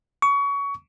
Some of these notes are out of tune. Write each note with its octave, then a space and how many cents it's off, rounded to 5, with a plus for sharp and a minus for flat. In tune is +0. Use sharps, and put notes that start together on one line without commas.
C#6 +25